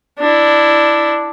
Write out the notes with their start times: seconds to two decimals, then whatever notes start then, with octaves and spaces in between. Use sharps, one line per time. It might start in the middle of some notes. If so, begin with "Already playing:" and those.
0.19 D4 E4